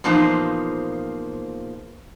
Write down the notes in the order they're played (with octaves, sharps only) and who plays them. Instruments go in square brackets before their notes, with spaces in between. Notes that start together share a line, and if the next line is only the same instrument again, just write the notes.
[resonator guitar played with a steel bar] E2 A#2 F3 A#3 D#4 C5